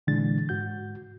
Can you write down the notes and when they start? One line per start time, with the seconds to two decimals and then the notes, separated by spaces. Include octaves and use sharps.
0.07 A#2 D3 E3 G#3 D4 A6
0.49 G#2 F#4 G6